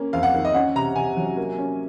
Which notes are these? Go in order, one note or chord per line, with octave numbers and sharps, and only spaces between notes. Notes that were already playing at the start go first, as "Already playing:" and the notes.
Already playing: A#3 C#4
F2 F5
F#5
D#3
D#5
C#4 F#5
C3 A#5
C3 G#5
F#3
A#3
C#4